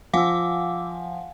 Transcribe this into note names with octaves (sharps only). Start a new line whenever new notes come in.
F3 F5 F#5 G#5 D6 E6